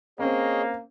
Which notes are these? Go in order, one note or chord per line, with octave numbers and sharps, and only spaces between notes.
A#3 C4 C#4 G#4 C#5 D#5